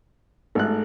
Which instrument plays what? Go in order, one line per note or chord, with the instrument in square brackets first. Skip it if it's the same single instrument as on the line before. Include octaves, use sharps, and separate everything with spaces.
[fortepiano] G#1 F#6 [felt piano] A3 A4